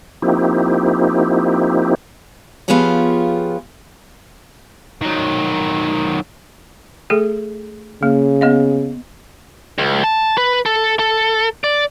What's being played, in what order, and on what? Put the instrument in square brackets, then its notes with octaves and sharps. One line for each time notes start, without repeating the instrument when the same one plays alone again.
[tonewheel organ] F3 A#3 C4 D#4 E4 G4
[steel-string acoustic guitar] F3 B3 F4 G4 G#4 C#5
[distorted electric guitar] D#3 F#3
[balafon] A3 G#4 A4
[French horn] C#3 [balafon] A#3
[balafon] B3 D#5 F5
[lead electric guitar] C#2
A5
B4
A4
A4
D5